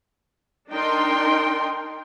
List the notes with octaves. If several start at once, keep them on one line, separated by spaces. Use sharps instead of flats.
D4 D#4 A#4 G5 C6